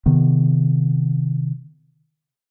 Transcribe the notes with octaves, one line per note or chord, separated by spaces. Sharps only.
C3 D#3 B3